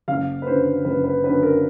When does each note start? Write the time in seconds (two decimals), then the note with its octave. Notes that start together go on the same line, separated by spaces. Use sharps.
0.08 F#1 F5
0.42 B4
0.47 F#2 D3 C5
0.85 F#1 B4
1.04 B4
1.24 F#2 D3 B4
1.43 A#4